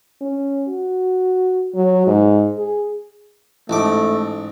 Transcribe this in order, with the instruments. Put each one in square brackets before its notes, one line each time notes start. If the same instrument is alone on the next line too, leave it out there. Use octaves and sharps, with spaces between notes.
[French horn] C#4
F#4
F#3
G#2
G#4
[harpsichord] A1 G#2 D6 [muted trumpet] A3